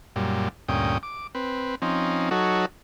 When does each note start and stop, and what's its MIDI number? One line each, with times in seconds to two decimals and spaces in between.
0.16 0.49 42
0.16 0.49 46
0.16 0.49 55
0.69 0.98 38
0.69 0.98 43
0.69 0.98 46
0.69 0.98 61
0.69 0.98 79
0.69 0.98 87
1.03 1.27 86
1.35 1.75 60
1.35 1.75 71
1.82 2.29 53
1.82 2.29 60
1.82 2.29 61
1.82 2.29 63
2.31 2.66 54
2.31 2.66 63
2.31 2.66 66
2.31 2.66 69
2.31 2.66 73